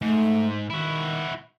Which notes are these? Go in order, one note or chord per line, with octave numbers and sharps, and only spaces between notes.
G#2 A3
D#3 E4 F#4